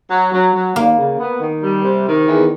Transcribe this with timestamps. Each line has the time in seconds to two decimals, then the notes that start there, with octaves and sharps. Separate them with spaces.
0.10 F#3
0.32 F#3
0.54 F#3
0.75 D#2 A#3
0.98 C#3
1.19 B3
1.40 D#3
1.62 G3
1.84 C3
2.06 D#3
2.27 E2